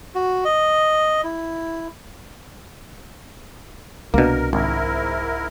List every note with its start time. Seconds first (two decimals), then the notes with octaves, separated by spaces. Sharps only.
0.15 F#4
0.45 D#5
1.24 E4
4.14 C2 B2 A#3 D4 A#4
4.53 G#1 G#2 E4 A#4